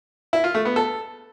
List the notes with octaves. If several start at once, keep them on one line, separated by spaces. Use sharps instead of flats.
E4
F4
A3
B3
A4